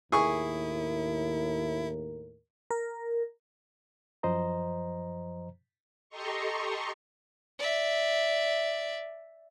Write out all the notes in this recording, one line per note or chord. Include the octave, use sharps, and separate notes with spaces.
D#2 A2 E4 G#4 A#4 C#6
A#4
F#2 F3 C5 D#5 A#5
G4 A4 D#5 A#5 C6 C#6
D5 E5